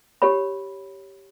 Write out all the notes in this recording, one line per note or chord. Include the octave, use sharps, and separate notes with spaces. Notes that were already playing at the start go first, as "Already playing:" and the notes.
G4 C#5 B5